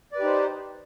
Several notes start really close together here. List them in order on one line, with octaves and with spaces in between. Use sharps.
D5 B4 G4 D#4 C5